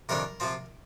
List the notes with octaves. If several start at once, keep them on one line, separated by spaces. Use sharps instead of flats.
F2 C3 D#3 G3 D4 A#4
C3 F3 C4